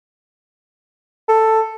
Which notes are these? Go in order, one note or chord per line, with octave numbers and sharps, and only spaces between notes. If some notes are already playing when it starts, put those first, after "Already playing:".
A4